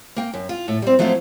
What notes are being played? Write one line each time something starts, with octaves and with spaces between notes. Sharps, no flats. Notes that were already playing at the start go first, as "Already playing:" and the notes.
A#3 G5
F#2
F4
A2 A4 C#5
G3 C4
F3 F#3 A3 C4 E4 F4